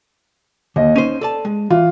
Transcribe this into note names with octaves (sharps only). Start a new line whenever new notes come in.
D#2 D3 D#5
C#4 D#4 C5 D#7
A4 D5 A5
G#3
E3 F4